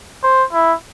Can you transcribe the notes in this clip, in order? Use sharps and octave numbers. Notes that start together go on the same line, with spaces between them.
C5
E4